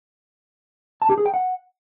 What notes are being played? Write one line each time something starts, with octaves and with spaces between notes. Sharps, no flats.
A5
G4
G#4
G5
F#5